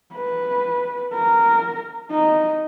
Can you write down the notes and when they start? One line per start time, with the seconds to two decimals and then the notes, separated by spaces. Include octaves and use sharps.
0.15 B4
1.14 A#4
2.11 D#4